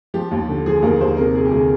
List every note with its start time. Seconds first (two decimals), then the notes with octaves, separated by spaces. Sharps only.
0.14 F3 G4
0.31 D#2
0.49 D3
0.66 F3 G#4
0.82 D#2 A#4
1.00 D#2 C5
1.17 C3 A#4
1.34 C3 G#4
1.45 G4
1.51 D2 G#4